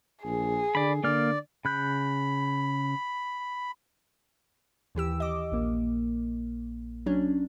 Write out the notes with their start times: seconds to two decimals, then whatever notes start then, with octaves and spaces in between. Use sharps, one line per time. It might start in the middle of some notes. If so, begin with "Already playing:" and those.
0.24 A#1 G#4
0.75 D3 D5 B5
1.04 D3 A#3 D5 F6
1.65 C#3 B5 F#6 G6
4.95 D#2 E3 G4 E6
5.20 D#5 D6
5.52 A#1 A#3
7.06 F#3 C#4 D4